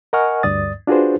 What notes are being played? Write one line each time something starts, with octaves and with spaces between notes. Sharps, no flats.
A#4 D#5 F#5 G#5 C#6 F6
D2 G2 D5 D#6 A6
D4 F4 F#4 G#4 B4 C5